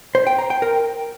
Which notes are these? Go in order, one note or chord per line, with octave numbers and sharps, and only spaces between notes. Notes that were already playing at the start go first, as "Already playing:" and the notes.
C5
G5
A#5
G5
A#4